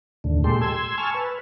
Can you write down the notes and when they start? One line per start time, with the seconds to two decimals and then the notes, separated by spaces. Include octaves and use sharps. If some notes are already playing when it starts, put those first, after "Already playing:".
0.24 D#2 A2 D3
0.44 A#2 G#3 G4 A4 C6
0.61 C6 E6 G#6
0.98 G#5 A5 C#6 E6 F6
1.15 B4